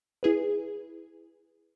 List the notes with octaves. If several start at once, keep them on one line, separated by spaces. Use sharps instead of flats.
E4 G#4 B4